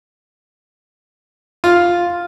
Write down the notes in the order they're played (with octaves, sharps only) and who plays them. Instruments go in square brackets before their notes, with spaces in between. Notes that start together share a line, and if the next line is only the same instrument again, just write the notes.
[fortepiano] F4